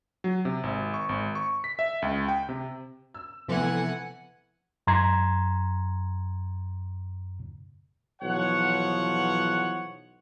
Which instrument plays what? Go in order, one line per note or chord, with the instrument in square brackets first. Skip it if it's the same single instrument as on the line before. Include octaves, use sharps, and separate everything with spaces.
[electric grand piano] F#3
C3
G#1
C#6
G#1
C#6
B6
E5
C#2
G5
C3
[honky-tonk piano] E6
[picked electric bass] C3 F3 B3 [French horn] E3 [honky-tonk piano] A3 C4 [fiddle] F#5 G#5
[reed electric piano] F#2 A#5 C6 G#6
[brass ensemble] B1 E3 F3 C#5 F#5